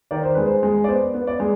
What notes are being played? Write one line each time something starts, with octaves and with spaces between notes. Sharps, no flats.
D#3 D5
C5
G#3 B4
C5
G#3
D5
B3 C5
B3
D5
G#3